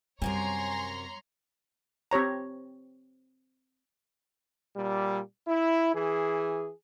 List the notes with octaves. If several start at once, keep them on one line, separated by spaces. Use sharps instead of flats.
F#2 C3 G3 A#4 C#5 G#5 A#5 C6
C4 G4 C#5 A#5
A#2 G3
E4
E3 G#4